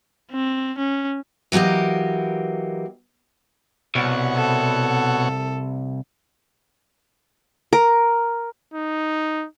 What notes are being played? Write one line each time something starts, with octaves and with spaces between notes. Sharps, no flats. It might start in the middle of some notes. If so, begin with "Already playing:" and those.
C4
C#4
E3 F#3 A#3 G4 D#5
C2 B2 C#5 F#5
A4
A#4
D#4